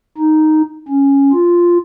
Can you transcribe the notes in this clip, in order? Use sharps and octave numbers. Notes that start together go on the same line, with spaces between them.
D#4
C#4
F4